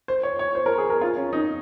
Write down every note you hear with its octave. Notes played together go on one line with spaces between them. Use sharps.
C5
C#5
C#5
C5
A#4
G#4
A#4
F4
C#4
D#4